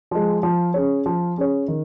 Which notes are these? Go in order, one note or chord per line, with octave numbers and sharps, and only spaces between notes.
F3 G#3
F3
C#4 G#4 C#5
F3
C#4 G#4 C#5
D#3